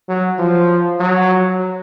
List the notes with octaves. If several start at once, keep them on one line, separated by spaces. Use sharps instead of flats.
F#3
F3
F#3